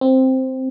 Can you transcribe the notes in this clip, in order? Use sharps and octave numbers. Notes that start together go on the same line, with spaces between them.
C4